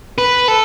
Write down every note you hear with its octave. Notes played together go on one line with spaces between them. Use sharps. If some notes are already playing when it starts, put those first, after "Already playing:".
B4
A4